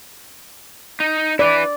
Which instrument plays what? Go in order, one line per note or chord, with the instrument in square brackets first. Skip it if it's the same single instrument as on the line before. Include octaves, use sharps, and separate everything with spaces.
[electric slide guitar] D#4
[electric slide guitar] E4 B4 [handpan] D5